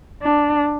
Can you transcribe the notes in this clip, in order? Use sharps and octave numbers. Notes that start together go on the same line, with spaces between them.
D4